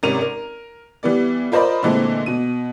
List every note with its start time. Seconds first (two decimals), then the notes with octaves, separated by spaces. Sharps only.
0.03 G#1 C3 C#4 A#4 D#7 F7
0.21 A#4
1.03 E3 G3 B3 D5
1.52 F4 A#4 C5 D5 D#5 B5
1.83 A#2 D3 E3 G#3 A3 C4
2.26 B2 D#7